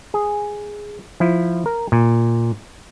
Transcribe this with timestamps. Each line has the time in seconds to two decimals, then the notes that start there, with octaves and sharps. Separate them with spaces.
0.14 G#4
1.20 F3 E4
1.66 A#4
1.92 A#2